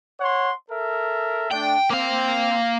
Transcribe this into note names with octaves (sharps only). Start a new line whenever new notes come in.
C#5 F#5 C6
A4 A#4 E5
A3 D4 G5
A#3 C4 F5